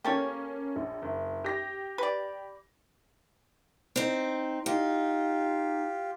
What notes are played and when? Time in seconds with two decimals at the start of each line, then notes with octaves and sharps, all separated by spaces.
0.04 A#3 C#4 G4 A4 C#5
0.76 A#1
1.02 F#1
1.44 G4 A#6
1.98 B4 D5
3.96 C4 D#4
4.66 D#4 F4 G4